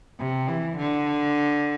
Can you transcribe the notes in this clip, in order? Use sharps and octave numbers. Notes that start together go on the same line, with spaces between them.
C3
E3
D3